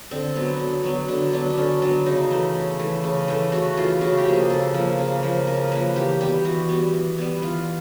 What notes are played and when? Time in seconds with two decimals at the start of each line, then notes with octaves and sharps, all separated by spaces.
0.11 D3 C4
0.36 F#3 B3
0.60 D3
0.84 F#3 B3
1.08 D3 D4
1.33 F#3 B3 D4
1.50 D4
1.57 D3 C#4
1.82 F#3 B3 D4
2.06 C#3 D#4
2.30 E3 A3
2.55 C#3
2.79 E3 A3
3.04 C#3
3.28 E3 A3
3.52 C#3 F#4
3.77 E3 A3 F4
4.01 C#3 F#4
4.17 G4
4.25 F3 A#3
4.34 G#4
4.50 C#3 A4
4.74 F3 A#3
4.99 C#3
5.23 F3 A#3
5.47 C#3 A#4
5.72 F3 A#3 B4
5.96 E3 G4
6.21 G3 B3 G4
6.45 E3 F#4
6.69 G3 B3
6.94 E3
7.18 G3 B3
7.42 E3 F4